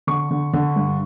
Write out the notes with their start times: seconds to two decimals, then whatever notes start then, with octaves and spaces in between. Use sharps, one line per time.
0.07 D3 C#6
0.31 D3
0.54 D3
0.76 G2